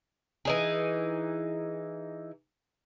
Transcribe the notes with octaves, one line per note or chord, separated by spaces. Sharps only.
E3 D#4 G#4